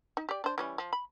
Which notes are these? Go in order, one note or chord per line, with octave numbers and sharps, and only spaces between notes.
D#4
G4 D5
D4 C5
E3 G3 C#4
F3
B5